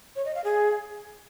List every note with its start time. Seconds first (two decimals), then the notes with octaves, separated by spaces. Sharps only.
0.16 C#5
0.25 D#5
0.35 F5
0.44 G#4